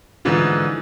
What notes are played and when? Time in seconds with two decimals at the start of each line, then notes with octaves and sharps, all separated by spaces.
0.25 G#2 D3 E3 F3